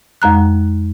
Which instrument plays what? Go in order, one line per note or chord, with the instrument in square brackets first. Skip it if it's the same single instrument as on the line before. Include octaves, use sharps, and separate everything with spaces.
[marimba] F2 G#3 A#5 F#6